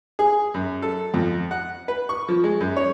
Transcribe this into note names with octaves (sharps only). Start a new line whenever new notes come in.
G#4
F#2
A4
F2
F#5
B4
C#6
F3
G#3
F#2
C#5